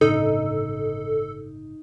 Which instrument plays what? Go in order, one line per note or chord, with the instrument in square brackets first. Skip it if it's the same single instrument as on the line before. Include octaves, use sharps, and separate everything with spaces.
[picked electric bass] G1 A2 C#3 [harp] D#4 [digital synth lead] A4